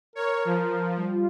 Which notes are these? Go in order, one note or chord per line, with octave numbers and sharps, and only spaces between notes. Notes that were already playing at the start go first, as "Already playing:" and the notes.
A#4 C#5
F3
G3 F4